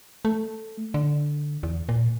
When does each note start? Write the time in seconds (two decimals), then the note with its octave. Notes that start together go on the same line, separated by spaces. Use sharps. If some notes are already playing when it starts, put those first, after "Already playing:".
0.25 A3
0.94 D3
1.63 E2
1.89 A#2